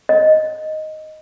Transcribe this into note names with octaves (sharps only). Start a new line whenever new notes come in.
D#5